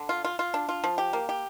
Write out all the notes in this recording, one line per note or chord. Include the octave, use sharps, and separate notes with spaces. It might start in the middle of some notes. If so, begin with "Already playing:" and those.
Already playing: D3
F4
F4
F4
D4
F4
F3
G4
A#3
G4